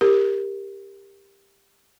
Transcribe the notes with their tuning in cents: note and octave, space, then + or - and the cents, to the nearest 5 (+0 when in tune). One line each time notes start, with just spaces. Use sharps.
G4 +15 A#4 +0 B5 +0